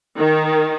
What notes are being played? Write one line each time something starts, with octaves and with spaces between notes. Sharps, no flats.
D#3